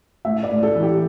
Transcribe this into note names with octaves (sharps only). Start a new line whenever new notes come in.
A2 E5
D5
A2
A4
E3
G4